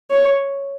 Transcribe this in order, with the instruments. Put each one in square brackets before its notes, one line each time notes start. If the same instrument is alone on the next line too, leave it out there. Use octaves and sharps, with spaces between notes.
[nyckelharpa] C#5